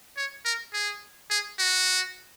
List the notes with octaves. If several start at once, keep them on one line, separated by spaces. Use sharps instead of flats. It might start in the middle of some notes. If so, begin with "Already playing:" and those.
C#5
A#4
G#4
G#4
F#4